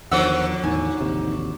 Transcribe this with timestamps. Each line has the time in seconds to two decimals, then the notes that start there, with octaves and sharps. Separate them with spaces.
0.12 E2 D3 D#3 F3 F#3 C5 F#5 E6
0.64 E2 A2 D#3 D#4 G#5
1.01 A1 D#2 C3